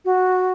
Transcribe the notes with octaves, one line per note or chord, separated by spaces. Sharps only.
F#4